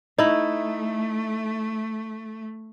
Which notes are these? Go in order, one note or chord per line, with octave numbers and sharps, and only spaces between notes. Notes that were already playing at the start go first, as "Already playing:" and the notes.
A3 D#4 E4